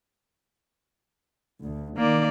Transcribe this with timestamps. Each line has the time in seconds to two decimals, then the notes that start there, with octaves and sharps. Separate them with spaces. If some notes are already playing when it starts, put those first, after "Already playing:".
1.62 D2
1.98 D#3 A#3 D5